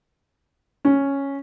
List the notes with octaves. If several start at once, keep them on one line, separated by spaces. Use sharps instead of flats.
C#4